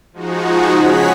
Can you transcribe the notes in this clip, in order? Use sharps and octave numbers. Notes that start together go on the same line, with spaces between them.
F3 G#3 D#4 F#4
C#3 G#4 C#5 F#5 B6